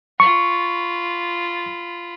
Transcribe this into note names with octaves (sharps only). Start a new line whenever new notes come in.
F4 B5 C#6